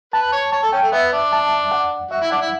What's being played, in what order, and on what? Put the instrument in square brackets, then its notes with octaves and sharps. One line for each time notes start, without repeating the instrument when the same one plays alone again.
[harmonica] B4 [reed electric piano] A5
[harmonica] C#5
[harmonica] C#5 [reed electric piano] A5
[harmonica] A4
[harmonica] C#4 [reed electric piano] G5
[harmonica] A3
[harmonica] B3 [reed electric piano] E5
[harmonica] D4
[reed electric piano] A5
F#5
[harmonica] F#4 [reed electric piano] E5
[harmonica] E4
[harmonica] D4 [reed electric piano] F#5
[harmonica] E4